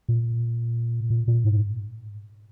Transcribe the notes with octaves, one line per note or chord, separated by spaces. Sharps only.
A#2
A#2
A#2
G#2